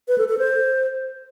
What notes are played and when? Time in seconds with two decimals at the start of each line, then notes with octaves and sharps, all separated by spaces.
0.08 B4
0.18 A4
0.28 A4
0.38 C5